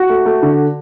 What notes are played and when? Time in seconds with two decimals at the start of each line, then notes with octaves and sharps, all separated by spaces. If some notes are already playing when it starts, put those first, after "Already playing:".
Already playing: F#4
0.09 A3
0.26 A3
0.42 D3